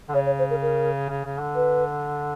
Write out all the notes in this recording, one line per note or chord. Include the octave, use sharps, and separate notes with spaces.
D3
C#3 C#5
C#5
C5
A#4
A#4
C#3
C#3
D3
B4